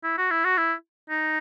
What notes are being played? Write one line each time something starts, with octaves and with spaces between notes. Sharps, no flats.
E4
F#4
E4
F#4
E4
D#4